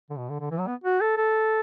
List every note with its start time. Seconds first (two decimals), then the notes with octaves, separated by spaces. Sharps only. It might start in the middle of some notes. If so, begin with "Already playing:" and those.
0.10 D3
0.18 B2
0.30 D3
0.40 D3
0.51 E3
0.59 F#3
0.67 B3
0.84 F#4
1.01 A4
1.17 A4